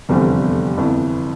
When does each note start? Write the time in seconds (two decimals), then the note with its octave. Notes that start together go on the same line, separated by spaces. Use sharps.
0.09 F1 E2 D3 G3 C4
0.77 G1 F2 E3